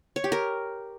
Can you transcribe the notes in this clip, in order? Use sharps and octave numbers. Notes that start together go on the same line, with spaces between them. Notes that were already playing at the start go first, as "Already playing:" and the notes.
C#5
G4
A#4